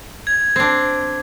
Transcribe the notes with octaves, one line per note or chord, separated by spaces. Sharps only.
G#6
C4 D4